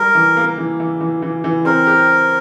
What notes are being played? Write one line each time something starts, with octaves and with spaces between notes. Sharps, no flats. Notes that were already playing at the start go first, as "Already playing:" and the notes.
Already playing: G3 A#4
E3
A#3
E3
E3
E3
E3
E3
C4 A#4
G4